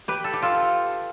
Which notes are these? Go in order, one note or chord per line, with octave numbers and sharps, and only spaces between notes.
G4 B4
A4
G4
F4 A4